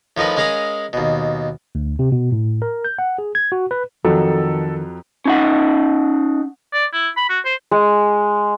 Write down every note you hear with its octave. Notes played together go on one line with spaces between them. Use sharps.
A2 F3 D#4 A#4 B4
G#3 C#4 A#4 F5 B5 D#6
D#2 B2
D2
C3
B2
A2
A#4
G6
F#5
G#4
G#6
F#4
B4
F2 D#3 F#3 A4
C#4 D#4 F#5
D5
E4
B5
F#4
C5
G#3